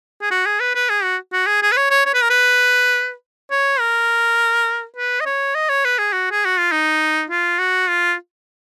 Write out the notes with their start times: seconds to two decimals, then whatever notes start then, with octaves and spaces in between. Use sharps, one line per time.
0.22 G#4
0.31 F#4
0.46 G#4
0.60 B4
0.75 B4
0.90 G#4
1.03 F#4
1.33 F#4
1.47 G#4
1.62 G#4
1.72 B4
1.77 C#5
1.91 C#5
2.06 C#5
2.14 B4
2.22 A#4
2.30 B4
3.51 C#5
3.80 A#4
4.96 B4
5.21 D#5
5.26 C#5
5.55 D#5
5.69 C#5
5.85 B4
5.98 G#4
6.13 F#4
6.31 G#4
6.45 F#4
6.58 F4
6.72 D#4
7.30 F4
7.59 F#4
7.88 F4